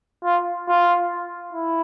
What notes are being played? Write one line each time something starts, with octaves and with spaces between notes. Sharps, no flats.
F4
F4
E4